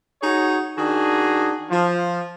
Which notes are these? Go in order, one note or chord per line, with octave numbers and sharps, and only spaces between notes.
D#4 F#4 G#4 C#5
D#3 D4 F#4 G#4
F3